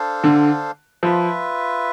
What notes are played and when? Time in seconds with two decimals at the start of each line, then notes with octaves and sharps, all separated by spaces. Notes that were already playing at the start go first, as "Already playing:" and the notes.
Already playing: D4 A4 C5 F5
0.24 D3
1.03 F3 F4 B4 E5